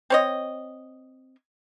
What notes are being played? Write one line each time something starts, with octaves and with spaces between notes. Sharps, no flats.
C4 C#5 D#5